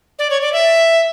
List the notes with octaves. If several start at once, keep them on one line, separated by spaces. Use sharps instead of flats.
D5
C#5
D5
E5